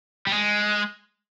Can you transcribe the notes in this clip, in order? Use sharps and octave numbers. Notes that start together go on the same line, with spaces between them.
G3
G#3